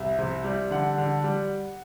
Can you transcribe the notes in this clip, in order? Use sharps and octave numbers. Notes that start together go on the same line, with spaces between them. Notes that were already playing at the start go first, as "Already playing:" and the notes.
Already playing: C2 E5
C3
G3
D3 F#5
D3
G3